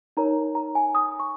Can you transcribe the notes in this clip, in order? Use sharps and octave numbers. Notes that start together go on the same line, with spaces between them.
D#4 A#4 C#5 A#5
A#5
G#5
D#6
C#6